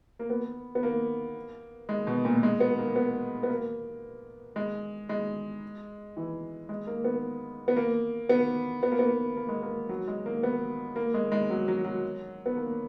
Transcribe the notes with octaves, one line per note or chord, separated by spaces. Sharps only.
A#3
B3
B3
A#3
G#3
B2
A#2
G#3
B3
A#3
B3
B3
A#3
G#3
G#3
E3
G#3
A#3
B3
B3
A#3
B3
B3
A#3
B3
A#3
G#3
A#3
F#3
G#3
A#3
B3
A#3
G#3
G#3
F#3
F#3
F#3
B3
A#3